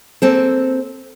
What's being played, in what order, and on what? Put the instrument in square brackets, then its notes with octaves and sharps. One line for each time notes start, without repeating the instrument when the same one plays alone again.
[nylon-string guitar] A#3 C4 A4